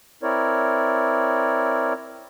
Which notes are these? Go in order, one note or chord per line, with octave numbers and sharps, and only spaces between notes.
C4 E4 A#4 C#5 D5